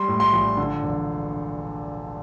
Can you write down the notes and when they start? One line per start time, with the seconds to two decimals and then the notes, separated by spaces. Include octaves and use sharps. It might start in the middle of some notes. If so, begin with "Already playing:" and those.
Already playing: G3 C6
0.08 A2
0.20 C6
0.33 A#1
0.57 D3
0.83 E1